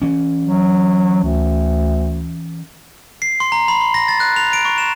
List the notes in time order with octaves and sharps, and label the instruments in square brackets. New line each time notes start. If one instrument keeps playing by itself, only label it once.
[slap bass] E3 C#4
[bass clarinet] F#3
D2
[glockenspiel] C7
C6
A#5
B5
C6
A#6
A6
F#6
F7
D7
C#6
E7